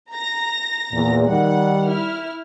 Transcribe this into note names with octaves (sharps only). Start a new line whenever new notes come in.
A#5 A#6
E2 A#2
D#3 G3 F#5
E4 F6